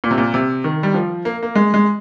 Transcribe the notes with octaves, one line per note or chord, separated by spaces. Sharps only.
A#2
C3
A#2
C3
D#3
G3
F3
A#3
A#3
G#3
G#3